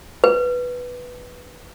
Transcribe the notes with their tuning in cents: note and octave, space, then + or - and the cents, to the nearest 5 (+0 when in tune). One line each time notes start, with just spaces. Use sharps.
B4 +0